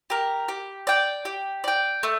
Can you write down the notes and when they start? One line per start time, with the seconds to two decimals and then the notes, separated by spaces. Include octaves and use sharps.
0.10 G4 A#4
0.48 G4
0.87 D5 G5
1.25 G4
1.64 D5 G5
2.03 A3